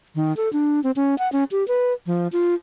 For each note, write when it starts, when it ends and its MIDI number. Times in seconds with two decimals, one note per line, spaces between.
0.15 0.35 51
0.37 0.51 69
0.53 0.83 62
0.84 0.91 60
0.96 1.18 61
1.19 1.31 78
1.32 1.44 61
1.51 1.66 67
1.68 1.93 71
2.06 2.27 53
2.32 2.54 65